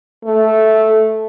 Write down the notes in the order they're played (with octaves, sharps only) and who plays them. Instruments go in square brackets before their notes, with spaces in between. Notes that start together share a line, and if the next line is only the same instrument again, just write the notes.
[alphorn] A3